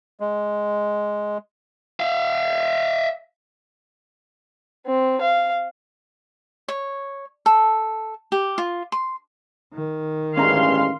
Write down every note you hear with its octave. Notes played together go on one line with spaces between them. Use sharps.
G#3
E5 F5
C4
F5
C#5
A4
G4
F4
C6
D#3
A1 G2 G#3 C#4 F5 A#5 C6